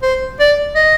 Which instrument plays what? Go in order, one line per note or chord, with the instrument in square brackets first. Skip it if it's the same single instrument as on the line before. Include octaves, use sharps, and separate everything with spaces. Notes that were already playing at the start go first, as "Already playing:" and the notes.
[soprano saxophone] C5
D5
D#5